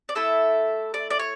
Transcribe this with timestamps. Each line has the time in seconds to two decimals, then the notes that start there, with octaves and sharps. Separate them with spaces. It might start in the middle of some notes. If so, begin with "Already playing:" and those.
0.09 D5
0.15 A3 E4 A4 E5
0.94 D5
1.10 D5
1.19 C#5